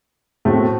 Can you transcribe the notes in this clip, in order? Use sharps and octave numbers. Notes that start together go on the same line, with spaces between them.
A2 A3 C4 F#4 A4